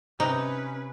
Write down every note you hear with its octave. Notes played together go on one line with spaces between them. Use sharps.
C3 C#4 D#4 B4